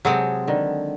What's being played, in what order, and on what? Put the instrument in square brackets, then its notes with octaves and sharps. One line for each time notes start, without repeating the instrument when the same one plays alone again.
[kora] C3 G#4 A4 [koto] F#3 G#3 C4
[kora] D3 D#3